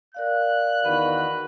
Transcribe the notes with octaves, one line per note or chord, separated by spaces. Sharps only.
A#4 D5 F5 F#6
E2 D#3 F#4 B4